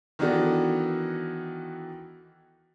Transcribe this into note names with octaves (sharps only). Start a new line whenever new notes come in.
D#3 E3 B3 D4 F#4 A4